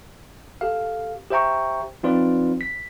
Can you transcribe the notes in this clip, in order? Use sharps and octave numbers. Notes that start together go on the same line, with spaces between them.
G4 A4 F5
G4 C5 E5 G5 A#5 C#6
F3 C4 D#4 F4 B4 D5
B6